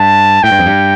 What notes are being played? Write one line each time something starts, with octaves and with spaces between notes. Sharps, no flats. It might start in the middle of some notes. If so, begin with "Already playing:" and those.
Already playing: G2 A5
A2 G5
G2
F2
G2